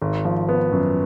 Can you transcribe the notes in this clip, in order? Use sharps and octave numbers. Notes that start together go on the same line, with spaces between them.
G#1
F3
B3
F#2